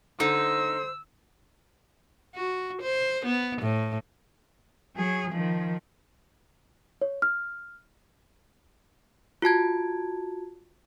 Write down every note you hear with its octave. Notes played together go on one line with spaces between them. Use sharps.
D3 D#4 C5 E6
F#4
C5
B3
A2
F#3 G#4
D#3 F3
C#5
F6
F4 F#4 A5 G#6